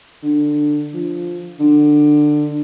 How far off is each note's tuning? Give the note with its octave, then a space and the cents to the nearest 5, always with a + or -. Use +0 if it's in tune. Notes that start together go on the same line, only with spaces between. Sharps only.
D3 +15
F3 +0
D3 +20